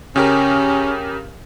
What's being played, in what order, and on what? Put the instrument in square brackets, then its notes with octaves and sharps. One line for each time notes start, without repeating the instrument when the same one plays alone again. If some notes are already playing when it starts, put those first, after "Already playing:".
[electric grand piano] C#3 G4 A#4 [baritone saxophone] C#4